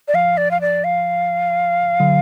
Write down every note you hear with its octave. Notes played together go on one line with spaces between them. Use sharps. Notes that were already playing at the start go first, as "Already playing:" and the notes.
D5
F3 F5
D5
F5
D5
F5
D3 F#3